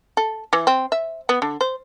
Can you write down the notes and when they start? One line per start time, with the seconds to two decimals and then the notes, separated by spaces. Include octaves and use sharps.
0.17 A4
0.53 E3
0.67 C4
0.92 E5
1.29 B3
1.42 D3
1.61 C5